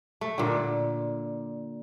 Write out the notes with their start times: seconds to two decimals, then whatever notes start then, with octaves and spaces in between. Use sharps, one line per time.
0.21 A3
0.38 A#2 D3